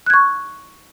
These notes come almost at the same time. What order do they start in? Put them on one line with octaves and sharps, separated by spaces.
F#6 G#6 C#6